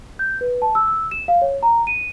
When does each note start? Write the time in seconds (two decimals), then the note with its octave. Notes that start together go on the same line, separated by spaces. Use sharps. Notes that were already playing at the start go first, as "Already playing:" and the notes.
0.19 G6
0.41 B4
0.62 A5
0.75 E6
0.88 E6
1.11 E7
1.28 F5
1.42 C#5
1.63 A#5
1.87 D#7